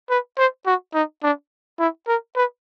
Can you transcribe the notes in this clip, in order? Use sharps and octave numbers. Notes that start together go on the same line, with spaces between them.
B4
C5
F#4
D#4
D4
E4
A#4
B4